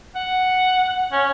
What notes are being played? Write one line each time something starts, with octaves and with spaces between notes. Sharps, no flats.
F#5
C#4